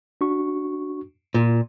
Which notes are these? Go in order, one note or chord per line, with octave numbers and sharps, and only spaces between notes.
D4 F#4 C#6
A#2 F4